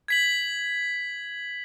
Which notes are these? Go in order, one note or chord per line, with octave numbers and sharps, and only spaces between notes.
G#6 B6 F#7